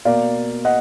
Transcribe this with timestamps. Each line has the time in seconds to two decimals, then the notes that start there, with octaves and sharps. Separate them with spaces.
0.05 B2 A#3 D5 F5
0.65 D#5 F#5